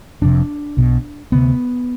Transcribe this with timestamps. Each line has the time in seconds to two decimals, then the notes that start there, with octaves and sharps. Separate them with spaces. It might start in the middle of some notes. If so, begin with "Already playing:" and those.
0.21 F1 F2 C3 D4
0.77 B1 B2
1.32 D2 C3 B3